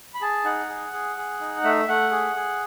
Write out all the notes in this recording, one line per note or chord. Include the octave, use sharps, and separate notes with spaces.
B5
G#4 A5
D#4 F#5
G#4
G#4
G#4
D#4
A3 E5
A3 F#5
G#4
G#4